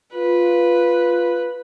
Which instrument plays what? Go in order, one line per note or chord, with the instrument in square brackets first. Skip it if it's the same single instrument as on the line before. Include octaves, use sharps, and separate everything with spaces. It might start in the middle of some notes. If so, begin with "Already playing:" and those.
[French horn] F4 [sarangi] B4